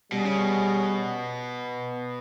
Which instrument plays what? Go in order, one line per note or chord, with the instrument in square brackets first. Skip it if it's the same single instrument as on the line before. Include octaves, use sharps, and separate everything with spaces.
[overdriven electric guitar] B2 [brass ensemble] G3 C#4 G#4
[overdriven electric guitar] C#3
B2